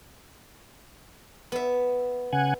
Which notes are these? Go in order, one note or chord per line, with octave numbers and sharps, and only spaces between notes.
B3 E5
C#3 F#5 G#5